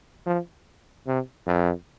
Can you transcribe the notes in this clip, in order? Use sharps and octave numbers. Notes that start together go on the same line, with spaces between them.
F3
C3
F2